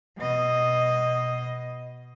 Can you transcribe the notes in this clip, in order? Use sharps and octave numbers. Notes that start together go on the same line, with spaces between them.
B2 D#5